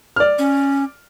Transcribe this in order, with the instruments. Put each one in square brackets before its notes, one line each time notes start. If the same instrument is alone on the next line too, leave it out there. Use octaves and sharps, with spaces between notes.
[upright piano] D5 F6
[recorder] C#4